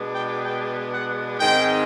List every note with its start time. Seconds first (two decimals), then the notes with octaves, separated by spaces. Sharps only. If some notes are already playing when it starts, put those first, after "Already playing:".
Already playing: B2 G#3 B3 D4
0.15 G5
0.45 G5
0.92 F#5
1.38 G#2 D#3 G#3 C4 G5